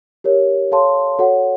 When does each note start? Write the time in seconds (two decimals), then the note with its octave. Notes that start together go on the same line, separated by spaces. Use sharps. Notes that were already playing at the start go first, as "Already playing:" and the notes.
0.24 G4 A#4 C#5
0.71 A4 C#5 F5 A5 C6
1.19 F#4 A4 C#5 F#5